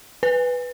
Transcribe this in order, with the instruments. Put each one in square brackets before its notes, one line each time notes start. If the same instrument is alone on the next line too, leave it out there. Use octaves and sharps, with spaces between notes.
[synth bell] B4